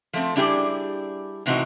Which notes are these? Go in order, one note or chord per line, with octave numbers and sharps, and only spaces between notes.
F3 A3 C4
G3 D4 E4 G4 G#4 D5
A2 C3 E3 C4 D#4 F#4